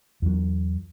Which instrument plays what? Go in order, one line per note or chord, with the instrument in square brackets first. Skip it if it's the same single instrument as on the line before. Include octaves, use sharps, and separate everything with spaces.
[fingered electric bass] E2 F#3